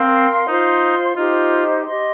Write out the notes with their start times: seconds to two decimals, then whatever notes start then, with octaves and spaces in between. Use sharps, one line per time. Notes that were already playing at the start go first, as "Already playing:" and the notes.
Already playing: C4 A#4 F5 C6
0.47 D#4 F4 C5 F5 C6
1.16 D#4 F4 G4 C5 D#5
1.85 G4 D#5 C6